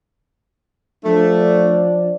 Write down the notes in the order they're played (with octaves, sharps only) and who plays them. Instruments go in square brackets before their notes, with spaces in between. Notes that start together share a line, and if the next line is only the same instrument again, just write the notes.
[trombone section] F3 D4 [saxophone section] A3